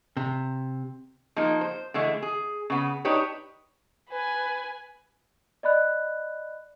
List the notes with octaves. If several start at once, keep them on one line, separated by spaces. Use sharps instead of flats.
C3
F3 A#3 D#4
C5
D3 E3 G#3 A3
G#4
C#3 B3
D4 D#4 G4 B4 C#5
B4 G#5
D5 D#5 B5 F#6